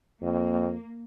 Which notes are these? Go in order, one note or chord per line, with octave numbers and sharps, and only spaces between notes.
F2 A#3